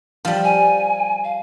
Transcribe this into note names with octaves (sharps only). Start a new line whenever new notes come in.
F3 G3
G#5
F5